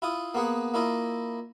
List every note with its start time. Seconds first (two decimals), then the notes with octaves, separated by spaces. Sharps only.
0.02 E4 F4 D#6
0.34 A#3 B3 G#4 F#5
0.74 A#3 E4 F4 D#5